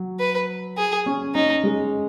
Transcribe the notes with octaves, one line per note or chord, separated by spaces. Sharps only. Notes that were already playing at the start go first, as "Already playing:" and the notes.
Already playing: F#3
B4
G#4
C#4
C#4 D#4
G#3